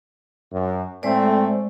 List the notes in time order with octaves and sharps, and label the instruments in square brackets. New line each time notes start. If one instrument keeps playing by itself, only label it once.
[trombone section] F#2
[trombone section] A2 A3 C4 [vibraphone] G#3 C5 D5